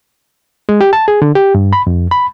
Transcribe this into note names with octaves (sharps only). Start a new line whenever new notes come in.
G#3
G4
A5
G#4
D3
G4
G2
B5
F2
B5